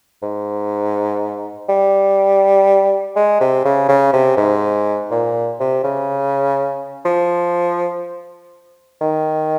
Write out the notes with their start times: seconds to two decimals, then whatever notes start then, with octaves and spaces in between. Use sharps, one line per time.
0.22 G#2
1.69 G3
3.16 G#3
3.40 C3
3.65 C#3
3.89 C#3
4.13 C3
4.37 G#2
5.11 A#2
5.60 C3
5.84 C#3
7.05 F3
9.01 D#3